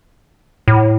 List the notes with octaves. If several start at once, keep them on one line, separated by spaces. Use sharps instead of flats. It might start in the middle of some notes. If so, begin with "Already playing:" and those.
A2